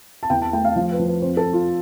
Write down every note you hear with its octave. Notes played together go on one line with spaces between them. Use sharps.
A5
E2 G5
A5
A3 G5
F5
F3 F5
B4
F3
B4
F2 C5
A4
F2
F4